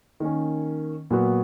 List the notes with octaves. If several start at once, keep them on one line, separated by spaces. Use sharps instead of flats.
D#3 A#3 C#4
A#2 F#3 B3 F#4